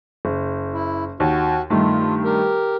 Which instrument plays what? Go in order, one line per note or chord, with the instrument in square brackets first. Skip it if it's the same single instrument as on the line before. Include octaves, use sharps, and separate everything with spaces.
[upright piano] F#1
[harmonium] E4
[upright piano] D#2 [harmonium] F#4
[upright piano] G2 D#3 A3 [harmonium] F4
[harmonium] G4 A#4